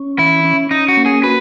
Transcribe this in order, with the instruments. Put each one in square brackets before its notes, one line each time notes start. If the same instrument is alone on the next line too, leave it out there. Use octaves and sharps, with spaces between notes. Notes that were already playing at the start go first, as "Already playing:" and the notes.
Already playing: [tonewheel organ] C#4
[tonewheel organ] E3 [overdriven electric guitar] E4
[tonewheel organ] C#4
[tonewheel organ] C#4 [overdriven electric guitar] D#4
[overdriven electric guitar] F#4
[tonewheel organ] A#3
[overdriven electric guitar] G#4
[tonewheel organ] F#4 [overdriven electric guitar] B4